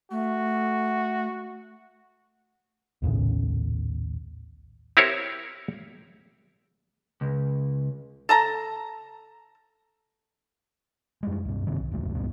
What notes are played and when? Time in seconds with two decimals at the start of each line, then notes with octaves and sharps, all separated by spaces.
0.11 A3 F#4
3.02 A#1 D#2 A2 C#3
4.97 C4 E4 G4 A#4 C5 C#5
7.21 C#2
8.29 A4 A5 A#5
11.23 F#2 G3 G#3
11.45 C#2 G2
11.67 G1 C3 D#3 C4
11.79 B1
11.91 E1 C#2 F#2 A3
12.15 C#2 G2 A#2 B3